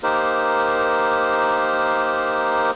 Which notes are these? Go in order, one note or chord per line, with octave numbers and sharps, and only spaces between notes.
A#3 D#4 G4 A#4 C5